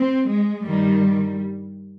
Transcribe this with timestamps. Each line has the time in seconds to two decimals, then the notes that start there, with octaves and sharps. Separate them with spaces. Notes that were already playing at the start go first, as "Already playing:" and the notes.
Already playing: C4
0.29 G#3
0.65 G2 D#3 G3